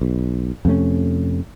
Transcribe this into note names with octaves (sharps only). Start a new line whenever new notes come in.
B1
F2 C3 A3 C#4